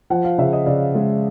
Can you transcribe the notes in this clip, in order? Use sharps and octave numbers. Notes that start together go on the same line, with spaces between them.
F3 F#5
F5
C#3 E5
D#5
C#3 D5
G#3